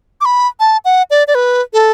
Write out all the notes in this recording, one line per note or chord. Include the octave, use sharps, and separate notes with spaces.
D6
B5
A5
F#5
D5
D5
B4
A4